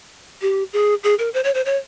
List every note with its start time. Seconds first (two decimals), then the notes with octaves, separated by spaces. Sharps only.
0.42 G4
0.73 G#4
1.04 G#4
1.19 A#4
1.34 C5
1.44 C#5
1.54 C5
1.66 C#5